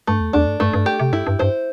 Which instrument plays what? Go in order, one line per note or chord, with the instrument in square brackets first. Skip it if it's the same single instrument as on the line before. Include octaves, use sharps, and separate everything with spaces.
[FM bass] G2 [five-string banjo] A3
[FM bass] E2
[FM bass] E2 [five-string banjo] D4
[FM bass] G2
[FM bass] G2 [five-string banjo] A3
[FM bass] G2
[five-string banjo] G4
[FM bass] C3
[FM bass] G2 [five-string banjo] E4
[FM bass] G2
[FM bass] G2 [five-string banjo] C5